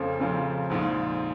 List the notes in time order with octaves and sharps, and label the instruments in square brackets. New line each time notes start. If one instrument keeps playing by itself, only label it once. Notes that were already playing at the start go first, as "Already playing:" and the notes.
Already playing: [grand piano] F1 F2 C#3 F3 C4
F1 F2 C#3 F3 C4
A#1 G#2 F3